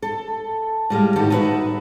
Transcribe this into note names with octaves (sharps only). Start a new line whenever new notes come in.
A4
A2 G3 G#3 F5
A2 D#3 E3 F#4 G4 A4
D#4 E4 F#4 G#4 B4 E5